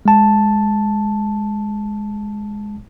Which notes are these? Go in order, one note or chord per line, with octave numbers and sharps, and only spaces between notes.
G#3 A5